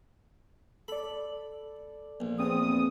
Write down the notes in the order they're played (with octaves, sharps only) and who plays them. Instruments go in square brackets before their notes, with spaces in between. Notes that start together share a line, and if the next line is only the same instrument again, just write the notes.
[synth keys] A4 D5 [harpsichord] B5
[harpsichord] A#1
[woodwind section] E2 D#6 [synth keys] C4